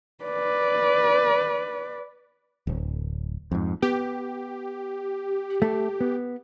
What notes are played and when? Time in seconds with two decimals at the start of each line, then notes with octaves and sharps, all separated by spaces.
0.24 B4 D5
2.67 D1
3.51 F2 G#2
3.82 B3 G4
5.62 A3
6.01 B3